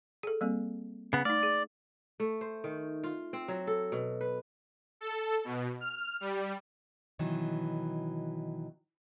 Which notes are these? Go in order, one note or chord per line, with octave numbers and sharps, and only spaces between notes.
G#4 A4
G3 A#3 C4
C#3 B3
A3 D#4 D5
G#4
A3
C5
D#3
F4
C4
F#3
A4
B2
B4
A4
B2
F6
G3
B2 D#3 E3 F#3